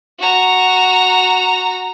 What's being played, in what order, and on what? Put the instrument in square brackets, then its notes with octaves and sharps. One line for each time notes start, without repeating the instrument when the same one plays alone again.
[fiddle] F#4 A#5